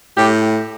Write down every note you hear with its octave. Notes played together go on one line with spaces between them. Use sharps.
A2 G4